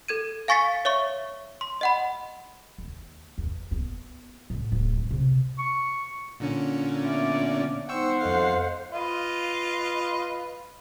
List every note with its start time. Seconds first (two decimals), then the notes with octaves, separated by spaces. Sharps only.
0.08 A4 G#6 D#7
0.48 F5 G#5 C#6 A6 B6 C#7
0.85 C#5 E5 C#6
1.61 C6
1.81 D#5 F#5 B5
2.78 D#2
3.38 E2
3.71 B3
4.50 A2
4.72 D1
4.97 A1
5.11 C3
5.58 C#6
6.40 A#2 D3 C#4
7.02 B3 D5 E5
7.89 B3 D#4 C5 F#5 G5 C#6 E6
8.21 F2 A4 D#5 F5
8.92 F4 B4 D#5